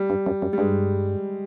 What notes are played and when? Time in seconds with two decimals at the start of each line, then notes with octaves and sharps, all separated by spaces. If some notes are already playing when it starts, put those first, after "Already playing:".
Already playing: G3
0.10 G2
0.26 F#2
0.42 F#2
0.53 G3
0.58 G2 G#3